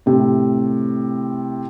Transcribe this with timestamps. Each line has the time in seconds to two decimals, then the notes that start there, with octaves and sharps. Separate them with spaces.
0.06 A2 C3